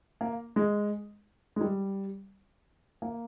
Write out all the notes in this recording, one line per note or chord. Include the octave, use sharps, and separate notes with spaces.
A#3
G#3
G#3
G3
A#3